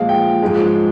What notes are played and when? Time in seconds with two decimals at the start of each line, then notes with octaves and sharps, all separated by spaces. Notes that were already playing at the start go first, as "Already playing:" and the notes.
Already playing: A#2 F3 G#3 F5
0.09 G5
0.42 G#2 F3 G#3